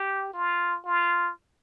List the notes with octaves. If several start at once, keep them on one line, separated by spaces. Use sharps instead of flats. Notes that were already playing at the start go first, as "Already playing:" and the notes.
Already playing: G4
F4
F4